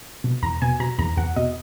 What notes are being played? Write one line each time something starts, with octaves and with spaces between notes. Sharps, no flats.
B2
E2 A#5
B2 G#5
B2 A#5
E2 A#5
E2 F#5
B2 D#5